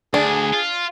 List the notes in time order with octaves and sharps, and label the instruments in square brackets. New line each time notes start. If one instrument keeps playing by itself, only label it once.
[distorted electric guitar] D2 [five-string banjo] D4 [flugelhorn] G#4
[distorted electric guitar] F4